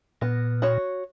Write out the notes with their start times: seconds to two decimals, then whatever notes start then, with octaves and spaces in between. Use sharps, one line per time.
0.21 A#2 B3
0.62 F#4 C#5